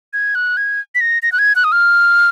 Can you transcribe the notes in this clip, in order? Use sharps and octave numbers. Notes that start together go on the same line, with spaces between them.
G#6
F#6
G#6
B6
A#6
A#6
F#6
G#6
F#6
D#6
F6